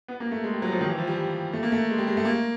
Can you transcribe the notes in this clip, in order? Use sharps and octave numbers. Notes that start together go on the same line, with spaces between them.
B3
A#3
A3
G#3
G3
F#3
F3
D#3
E3
F3
G3
A3
A#3
A3
G#3
G3
G#3
A3
A#3